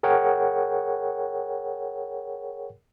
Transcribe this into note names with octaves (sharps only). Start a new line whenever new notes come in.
G#4 A#4 C#5 F#5 G5